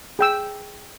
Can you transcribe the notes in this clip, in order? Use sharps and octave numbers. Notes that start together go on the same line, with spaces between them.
G#4 G5 E6